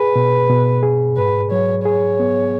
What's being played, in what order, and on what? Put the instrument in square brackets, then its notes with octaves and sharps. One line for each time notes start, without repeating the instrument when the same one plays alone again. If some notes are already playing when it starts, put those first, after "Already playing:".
Already playing: [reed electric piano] G#4 [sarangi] B4
[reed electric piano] B2
B2
G#4
[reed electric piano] G#2 [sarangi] B4
[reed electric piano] F#3 [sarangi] C#5
[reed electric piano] G#4 [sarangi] C#5
[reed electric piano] B3